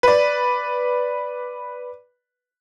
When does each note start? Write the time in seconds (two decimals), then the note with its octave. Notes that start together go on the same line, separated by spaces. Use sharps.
0.03 B4 D5